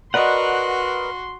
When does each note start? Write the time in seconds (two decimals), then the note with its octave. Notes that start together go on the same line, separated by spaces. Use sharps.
0.14 F#4 A#4 B4 D5 D#5 F#5 C6